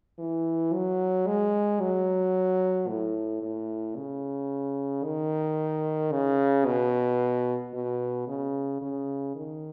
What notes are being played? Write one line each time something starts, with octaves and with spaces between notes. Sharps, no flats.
E3
F#3
G#3
F#3
A2
A2
C#3
D#3
C#3
B2
B2
C#3
C#3
D#3